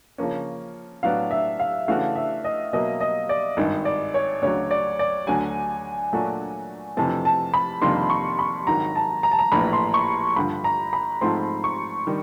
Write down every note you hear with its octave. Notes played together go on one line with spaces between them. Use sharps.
C#3 F3 A#3 C#4
A2 F#3 B3 D4 F5
E5
F5
C#3 E3 A3 D4 F#4 F5
E5
D#5
B2 F#3 A#3 D#5
D#5
D5
G#1 G2 D#3
D5
C#5
D2 C#3 F#3 C#5
D5
D5
D2 D3 F#3 G#5
A#2 F#3 A3 D4 F#4
F2 C3 E3 A3 C4 A5
A5
B5
F2 C3 D#3 G3 A#3 C6
C#6
B5
G#1 G#2 D#3 F#3 A#5
A5
A#5
A5
A#5
A#1 A2 E3 B5
C6
C#6
G2 D3 F3 B5
A#5
B5
G#2 F3 A3 C4 C6
C#6
D#3 G3